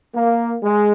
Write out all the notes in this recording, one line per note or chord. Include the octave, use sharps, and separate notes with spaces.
A#3
G#3